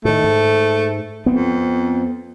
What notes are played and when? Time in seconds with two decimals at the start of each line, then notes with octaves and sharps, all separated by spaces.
0.05 A2 D#3 A3
0.24 G#2
1.26 F2 B3 C4